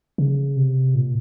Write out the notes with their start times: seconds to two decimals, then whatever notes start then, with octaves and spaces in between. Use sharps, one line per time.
0.18 C#3
0.57 C3
0.95 A#2